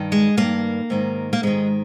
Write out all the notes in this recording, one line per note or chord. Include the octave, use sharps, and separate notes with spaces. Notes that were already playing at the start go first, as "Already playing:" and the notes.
Already playing: G2 D#3
G#3
G2 D#3 A#3
G#2 D#3
A#3
G#2 D#3 G#3